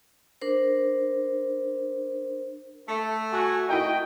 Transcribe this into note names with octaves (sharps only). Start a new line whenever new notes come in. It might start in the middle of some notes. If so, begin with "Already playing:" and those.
D4 A#4 C5
A3 A4
F#4 G#5 C#6
A3 D#4 E4 F#4 A#4 D#5 G5